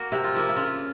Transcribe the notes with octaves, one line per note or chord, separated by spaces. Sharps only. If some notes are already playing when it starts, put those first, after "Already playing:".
Already playing: A#3 F#4
C3 E4
F4
F3 A#3 E4
E4
C#3 F4